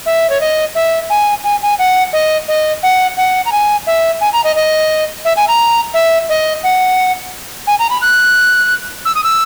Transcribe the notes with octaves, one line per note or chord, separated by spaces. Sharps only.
E5
C#5
D#5
E5
G#5
G#5
G#5
F#5
D#5
D#5
F#5
F#5
A#5
G#5
E5
G#5
A#5
D#5
D#5
E5
G#5
A#5
E5
D#5
F#5
G#5
A#5
B5
F#6
E6
D#6
E6